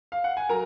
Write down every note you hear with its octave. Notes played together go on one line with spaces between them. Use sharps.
F5
F#5
G#5
F#3 A#4 A#5